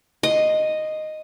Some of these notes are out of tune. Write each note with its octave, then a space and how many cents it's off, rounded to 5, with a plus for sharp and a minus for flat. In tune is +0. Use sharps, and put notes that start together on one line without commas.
D#5 -5 C6 +0